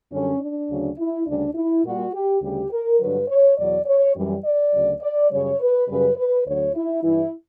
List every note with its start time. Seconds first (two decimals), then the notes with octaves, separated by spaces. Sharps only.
0.12 F#2 D3 G3 C#4
0.40 D4
0.68 D2 C#3 F#3
0.98 E4
1.26 D2 C#3 G3 D4
1.55 E4
1.84 A#2 G3 F#4
2.14 G4
2.41 D2 C#3 G3 G4
2.71 A#4
3.00 G2 D3 F#3 B4
3.28 C#5
3.57 E2 B2 F#3 D5
3.86 C#5
4.15 F#2 E3 G3
4.44 D5
4.73 D2 C#3 F#3
5.01 D5
5.31 F#2 C#3 G3 C#5
5.60 B4
5.88 F#2 C#3 G3 B4
6.17 B4
6.46 D2 D3 F#3 C#5
6.74 E4
7.03 G2 E3 G3 E4